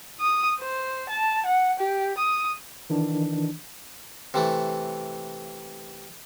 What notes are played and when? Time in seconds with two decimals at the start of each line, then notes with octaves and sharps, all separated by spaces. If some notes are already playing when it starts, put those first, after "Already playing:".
0.20 D#6
0.59 C5
1.09 A5
1.46 F#5
1.79 G4
2.18 D#6
2.90 D#3 E3 D4
4.34 C3 E3 A3